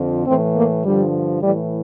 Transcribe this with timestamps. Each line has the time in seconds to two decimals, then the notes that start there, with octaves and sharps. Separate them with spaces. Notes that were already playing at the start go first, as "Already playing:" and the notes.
Already playing: F2 D3 F3
0.26 A2 E3 C4
0.56 A#3
0.84 G2 D3 F3 G3
1.41 A2 E3 G3